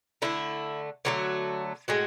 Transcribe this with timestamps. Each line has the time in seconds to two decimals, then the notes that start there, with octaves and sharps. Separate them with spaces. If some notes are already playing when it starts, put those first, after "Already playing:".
0.22 D3 A3 E4
1.05 D3 F#3 A3 F#4
1.88 A2 G#3 F#4